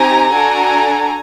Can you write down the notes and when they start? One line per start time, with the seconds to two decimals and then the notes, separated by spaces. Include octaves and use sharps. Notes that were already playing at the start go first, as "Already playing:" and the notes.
Already playing: C4 D#4 G4 G#5 A#5
0.31 D4 F#4 A4 G#5 A#5